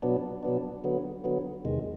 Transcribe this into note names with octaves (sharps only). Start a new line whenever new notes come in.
B2 F#3 B3 D4
B2 F#3 B3 D4
D3 F#3 B3
D3 F#3 B3
E2 C3 D#3 G#3